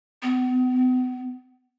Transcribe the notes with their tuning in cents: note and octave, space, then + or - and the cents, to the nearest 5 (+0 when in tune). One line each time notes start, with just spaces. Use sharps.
B3 +40